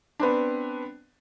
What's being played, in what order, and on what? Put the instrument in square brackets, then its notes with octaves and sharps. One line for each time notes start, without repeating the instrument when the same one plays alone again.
[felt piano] B3 C4 D4